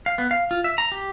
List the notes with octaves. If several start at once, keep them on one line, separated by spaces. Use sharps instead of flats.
F5
B3
F5
F4
E5
A#5
G4